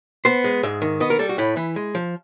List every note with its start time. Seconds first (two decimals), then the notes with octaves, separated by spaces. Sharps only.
0.25 B3 C5
0.44 G#3
0.63 G#2 E5
0.82 D#3
1.00 B3 D#5
1.10 A#4
1.19 G3 A4
1.29 F#4
1.38 A2 E4
1.57 E3
1.76 G#3
1.95 F3